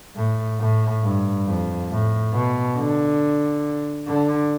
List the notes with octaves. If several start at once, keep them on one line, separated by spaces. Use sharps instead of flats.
A2
A2
G2
F2
A2
B2
D3
D3